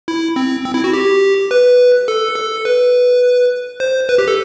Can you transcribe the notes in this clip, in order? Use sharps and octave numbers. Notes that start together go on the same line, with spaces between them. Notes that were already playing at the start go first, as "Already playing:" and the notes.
E4
C4
C4
E4
F#4
G4
B4
A4
A4
B4
C5
B4
G4
A4